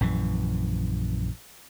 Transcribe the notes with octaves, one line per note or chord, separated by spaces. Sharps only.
A#1 F#2 E3